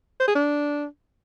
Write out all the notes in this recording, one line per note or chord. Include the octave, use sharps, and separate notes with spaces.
C5
G#4
D4